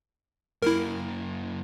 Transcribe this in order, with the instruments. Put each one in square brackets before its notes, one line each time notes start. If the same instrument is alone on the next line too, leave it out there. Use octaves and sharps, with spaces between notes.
[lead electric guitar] F#2 A#3 [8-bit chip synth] E4 A#4